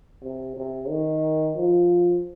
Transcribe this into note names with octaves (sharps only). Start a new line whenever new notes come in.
C3
C3
D#3
F3